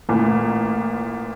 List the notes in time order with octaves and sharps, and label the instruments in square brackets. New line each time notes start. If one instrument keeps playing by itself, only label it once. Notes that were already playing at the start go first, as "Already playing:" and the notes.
[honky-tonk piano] A1 A#2